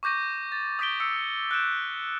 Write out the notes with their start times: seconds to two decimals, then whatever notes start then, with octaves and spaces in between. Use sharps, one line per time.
0.03 C#6 D6 G6 A#6 D#7
0.52 A6
0.79 D#6 G6 B6 D7 G7
1.00 E6 C#7
1.51 F#6 G6 D7 E7